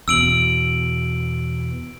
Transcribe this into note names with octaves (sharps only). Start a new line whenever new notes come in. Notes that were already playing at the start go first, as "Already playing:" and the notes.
E2 B2 E6 D7 F#7